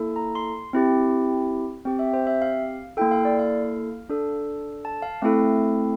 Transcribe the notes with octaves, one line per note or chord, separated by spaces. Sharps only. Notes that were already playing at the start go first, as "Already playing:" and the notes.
Already playing: A#3 E4 A4
A#5
C6
C4 E4 G4
C4 G4 G5
E5
C5
E5
F5
A#3 E4 A4 G5
F5
D5
F5
D4 A4
A5
F5
A3 C4 E4 A4 F5